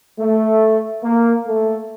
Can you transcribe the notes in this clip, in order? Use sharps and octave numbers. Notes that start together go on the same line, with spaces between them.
A3
A#3
A3